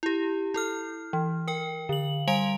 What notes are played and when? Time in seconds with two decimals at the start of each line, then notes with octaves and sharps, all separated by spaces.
0.03 E4 G4
0.54 E4 A4 F6
1.13 E3
1.48 A#4 G5
1.89 D3 F#7
2.28 G3 F5 G#5 C6 D7 F7